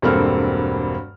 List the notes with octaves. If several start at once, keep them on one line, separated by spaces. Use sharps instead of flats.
E1 G2 A#3 C4 A4 F6